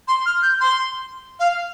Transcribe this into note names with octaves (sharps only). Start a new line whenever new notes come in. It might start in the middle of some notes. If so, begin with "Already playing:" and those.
C6
F6
G6
C6
F5